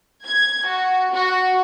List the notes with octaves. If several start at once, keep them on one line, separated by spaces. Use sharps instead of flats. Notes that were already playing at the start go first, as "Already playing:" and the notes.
G#6
F#4
F#4